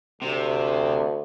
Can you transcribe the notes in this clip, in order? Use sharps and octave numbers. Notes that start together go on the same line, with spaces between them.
D2 C3